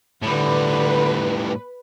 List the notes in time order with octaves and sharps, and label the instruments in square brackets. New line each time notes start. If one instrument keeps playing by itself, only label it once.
[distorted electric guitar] A2 G3 [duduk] D3 [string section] B4